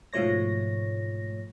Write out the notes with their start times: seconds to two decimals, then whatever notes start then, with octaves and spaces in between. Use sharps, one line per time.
0.13 G#2 B2 F3 A3 C#5 A#6